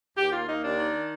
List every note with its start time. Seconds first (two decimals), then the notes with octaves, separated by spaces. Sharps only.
0.17 D#2 G4
0.32 A#3 F4
0.47 A#3 D#4
0.62 D#2 D4
0.78 D#3